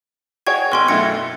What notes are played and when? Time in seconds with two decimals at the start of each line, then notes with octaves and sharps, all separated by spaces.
0.47 F#4 G#4 C#5 G5 C#6 G#6
0.72 G#1 G5 C6 C#6
0.88 F#2 B2 A3 G#6 A#6 C#7